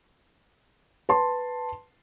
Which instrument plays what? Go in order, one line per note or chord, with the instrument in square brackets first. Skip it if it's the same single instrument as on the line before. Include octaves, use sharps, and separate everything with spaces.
[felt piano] B4 A5 C6